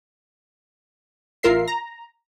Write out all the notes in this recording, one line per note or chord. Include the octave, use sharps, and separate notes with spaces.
A1 F4 A#4 E5 C7
A#5